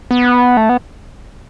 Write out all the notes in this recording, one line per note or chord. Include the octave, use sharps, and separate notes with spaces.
B3
A3
B3